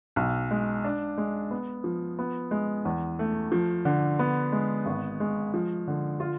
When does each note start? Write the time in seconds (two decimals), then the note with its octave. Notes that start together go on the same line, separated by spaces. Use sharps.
0.16 B1
0.51 G#3
0.84 D4
1.18 G#3
1.51 B3
1.84 F3
2.19 B3
2.51 G#3
2.85 E2
3.19 A3
3.52 F3
3.85 D3
4.19 B3
4.52 G#3
4.86 G#1
5.20 G#3
5.54 F3
5.88 D3
6.20 F4